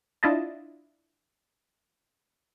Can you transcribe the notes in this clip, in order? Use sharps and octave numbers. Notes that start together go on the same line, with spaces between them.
D4 E4 F4 D#5 A5